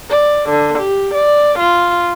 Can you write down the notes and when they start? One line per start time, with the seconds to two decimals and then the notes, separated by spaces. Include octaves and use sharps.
0.11 D5
0.49 D3
0.77 G4
1.13 D5
1.58 F4